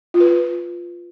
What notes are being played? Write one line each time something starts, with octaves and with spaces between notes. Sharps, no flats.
F4
B4
F4